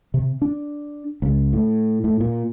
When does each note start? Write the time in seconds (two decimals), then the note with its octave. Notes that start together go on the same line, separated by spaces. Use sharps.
0.14 C3
0.42 D4
1.22 C#2
1.53 A2
2.04 A2
2.20 A#2